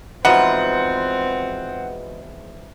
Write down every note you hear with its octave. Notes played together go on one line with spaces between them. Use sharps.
E2 G#2 F3 C4 F#4 B4 D#5 F#5